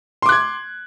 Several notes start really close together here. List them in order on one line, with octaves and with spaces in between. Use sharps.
C6 D6 F#6 G#6